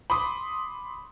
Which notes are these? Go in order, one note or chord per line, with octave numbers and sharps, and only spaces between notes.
B5 C6 D6 D#6